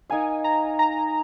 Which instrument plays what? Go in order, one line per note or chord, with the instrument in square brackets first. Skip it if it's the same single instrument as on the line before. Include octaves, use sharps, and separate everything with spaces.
[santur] D#4 A#4 F5 [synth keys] G#5
[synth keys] A#5
A#5